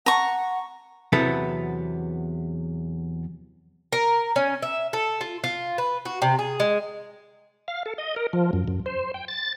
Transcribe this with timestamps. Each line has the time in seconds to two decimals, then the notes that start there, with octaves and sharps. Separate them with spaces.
0.06 F#5 A#5 C#6
1.12 E2 C3 F#3 B3 E4 A4
3.92 A#4
4.36 C#4
4.62 E5
4.93 A4
5.21 F4
5.44 F4
5.78 B4
6.05 F#4
6.22 C3
6.39 G#4
6.60 G#3
7.68 F5
7.86 A4
7.98 D#5
8.16 A#4
8.33 F3
8.53 F#2
8.68 F#2
8.86 C5
9.14 G5
9.28 A6